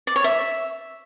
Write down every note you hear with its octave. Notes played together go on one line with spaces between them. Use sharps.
D5
C#5
E5